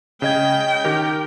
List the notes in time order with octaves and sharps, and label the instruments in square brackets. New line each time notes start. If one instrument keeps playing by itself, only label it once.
[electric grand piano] C#3 D#5 G#6 [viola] G5
[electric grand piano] D#3 G4 A#4